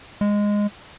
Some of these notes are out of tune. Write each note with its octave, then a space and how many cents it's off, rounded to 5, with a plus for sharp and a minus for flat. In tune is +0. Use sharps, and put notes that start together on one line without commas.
G#3 -10